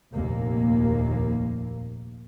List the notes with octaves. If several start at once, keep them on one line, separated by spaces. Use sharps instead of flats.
F1 A#1 D#2 A#3